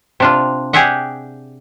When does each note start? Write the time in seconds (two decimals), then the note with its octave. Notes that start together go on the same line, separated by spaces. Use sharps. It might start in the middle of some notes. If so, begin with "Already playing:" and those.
0.20 C3 D4 F4
0.73 G4 G#4 D5 E5 F#5